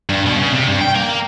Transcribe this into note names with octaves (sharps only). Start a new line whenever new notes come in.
G2
B2
C#3
C3
G2
G5
A#3